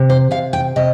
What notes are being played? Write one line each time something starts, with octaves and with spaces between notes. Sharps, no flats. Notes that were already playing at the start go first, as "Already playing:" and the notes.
Already playing: C3
C5
C3 F5
G5
C3 D#5